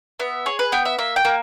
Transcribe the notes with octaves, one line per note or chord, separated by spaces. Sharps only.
B3 E5
G#4 C#5
B4
B3 G5
E5
A#3 E5
G5
A#3